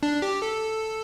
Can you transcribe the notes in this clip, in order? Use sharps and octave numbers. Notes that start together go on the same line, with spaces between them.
D4
G4
A4